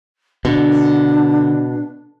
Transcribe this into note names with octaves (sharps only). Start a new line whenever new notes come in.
B2 D3 D4